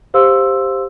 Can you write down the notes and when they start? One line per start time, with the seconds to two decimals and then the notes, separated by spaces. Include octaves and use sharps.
0.14 G4 C5 F5 C6 E6